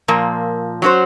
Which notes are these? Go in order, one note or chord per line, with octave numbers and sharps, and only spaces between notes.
A#2 F3 A#3
F#3 C#4 F#4 C5